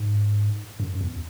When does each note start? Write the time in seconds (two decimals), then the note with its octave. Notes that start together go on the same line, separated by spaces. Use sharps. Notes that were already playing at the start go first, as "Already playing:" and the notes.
Already playing: G#2
0.80 F#2
1.01 E2